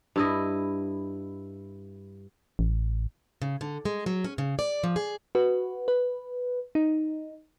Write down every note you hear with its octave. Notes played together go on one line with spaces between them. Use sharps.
G2 E4 D#5
A1
C#3
D3
G#3
F#3
C#4
C#3
D5
F3
G#4
F#4 B4
B4
D#4